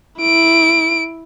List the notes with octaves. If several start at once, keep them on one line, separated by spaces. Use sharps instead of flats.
E4 D7